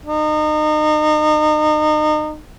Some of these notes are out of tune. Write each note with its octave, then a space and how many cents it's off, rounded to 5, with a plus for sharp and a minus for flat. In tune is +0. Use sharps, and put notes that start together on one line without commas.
D#4 -30